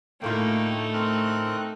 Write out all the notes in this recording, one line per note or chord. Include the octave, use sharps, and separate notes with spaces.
D2 A2 A3 A#3 D#4 F4 G5
C4 A#4 F#6